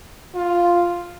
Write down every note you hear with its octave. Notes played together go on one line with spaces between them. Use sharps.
F4